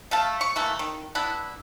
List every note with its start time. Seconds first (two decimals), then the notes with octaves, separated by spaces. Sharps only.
0.11 A3 F5 A5
0.41 C#6
0.56 E3 A3 A#3
0.79 D#3
1.15 B3 D4 E4